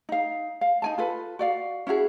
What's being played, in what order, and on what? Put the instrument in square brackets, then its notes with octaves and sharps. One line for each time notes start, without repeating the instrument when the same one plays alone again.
[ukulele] D#4 F5
F5
D#4 G#5 A5
F4 A4 B4
F#4 D5 F5
C#4 E4 F#4 G#4